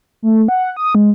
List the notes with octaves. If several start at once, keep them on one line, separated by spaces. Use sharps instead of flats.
A3
F#5
D#6
G#3